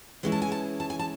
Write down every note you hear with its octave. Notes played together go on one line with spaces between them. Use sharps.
E3 G#3 C#4 E4
A5
G#5
A5
A5
G#5
A5